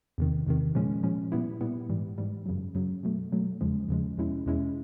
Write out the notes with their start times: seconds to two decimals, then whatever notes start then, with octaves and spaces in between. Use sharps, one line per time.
0.18 E2 C3 D#3
0.47 E2 C3 D#3
0.75 A#2 F3 G#3 C#4
1.03 A#2 F3 G#3 C#4
1.32 A#2 G3 B3 E4
1.61 A#2 G3 B3 E4
1.89 G#2 E3 G3
2.18 G#2 E3 G3
2.46 F#2 C#3 F#3
2.75 F#2 C#3 F#3
3.03 B2 F#3 A3
3.32 B2 F#3 A3
3.61 E2 C#3 F3 G#3
3.89 E2 C#3 F3 G#3
4.18 E2 B2 G#3 C#4 E4
4.46 E2 B2 G#3 C#4 E4